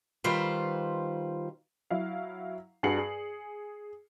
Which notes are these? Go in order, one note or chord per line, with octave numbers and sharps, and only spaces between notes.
D#3 G3 F4 B4 C5
F#3 E4 F5
G2 F#4 G#4 C7 C#7 F#7
G#4